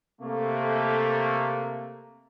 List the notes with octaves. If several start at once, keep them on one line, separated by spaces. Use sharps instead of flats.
C3 A3 A#3